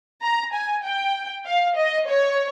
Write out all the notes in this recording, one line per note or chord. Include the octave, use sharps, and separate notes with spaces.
A#5
G#5
G5
F5
D#5
C#5